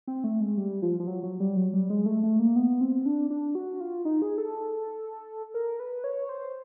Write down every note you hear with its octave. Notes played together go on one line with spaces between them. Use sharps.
C4
A3
G#3
G3
F3
F3
F#3
F#3
G3
F#3
G3
G#3
A3
A3
A#3
B3
C4
D4
D4
F#4
F4
D#4
G#4
A4
A#4
B4
C#5
C5